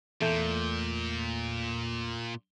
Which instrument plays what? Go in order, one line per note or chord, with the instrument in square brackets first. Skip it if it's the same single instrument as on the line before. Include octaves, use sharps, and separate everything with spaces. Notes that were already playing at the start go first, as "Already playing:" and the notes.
[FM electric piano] E2 A3 G6 [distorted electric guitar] A#2